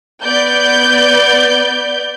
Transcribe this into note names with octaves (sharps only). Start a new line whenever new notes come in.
B3 D5 G6